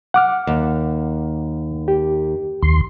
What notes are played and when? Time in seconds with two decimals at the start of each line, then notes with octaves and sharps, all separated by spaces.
0.14 F#5 D6 F6
0.47 D#2
1.88 G4
2.62 D#2 C6